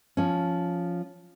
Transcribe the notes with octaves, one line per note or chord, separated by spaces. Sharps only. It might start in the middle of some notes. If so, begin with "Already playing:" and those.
F3 C#4